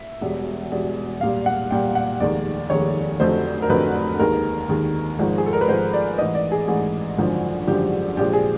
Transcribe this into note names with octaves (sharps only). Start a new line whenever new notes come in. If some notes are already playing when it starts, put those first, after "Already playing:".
Already playing: E5
E1 E2 B2 G3
E1 E2 B2 G3
C2 A#2 G3 F5
F#5
C2 A#2 G3 G5
F#5
F1 D#2 D#3 G#3 D5
F1 D#2 D#3 G#3 C#5
F1 F2 D3 F#3 A3 C5
A#4
F1 F2 D3 F#3 A3 B4
D#2 D#3 G#3 A#4
D#2 D#3 G#3
G#1 G#2 F3 G#3
G#4
A4
A#4
B4
G#1 G#2 F3 G#3 C5
D5
A1 G#2 E3 D#5
D5
G#4
A1 G#2 E3 G#4
G#1 F#2 D3 F3
G#1 F#2 D3 F3 G4
A#1 A#2 F3 G#3 G4
G#4